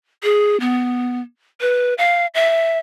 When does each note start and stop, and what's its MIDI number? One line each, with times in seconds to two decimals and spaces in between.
0.23 0.59 68
0.60 1.22 59
1.61 1.94 71
1.98 2.27 77
2.35 2.79 76